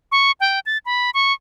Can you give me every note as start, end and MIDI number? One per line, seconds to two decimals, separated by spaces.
0.12 0.32 85
0.40 0.60 79
0.66 0.78 93
0.86 1.10 83
1.14 1.33 85